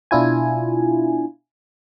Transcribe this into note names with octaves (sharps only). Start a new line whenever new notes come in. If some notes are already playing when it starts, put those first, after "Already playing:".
B2 D4 E4 F4 G#5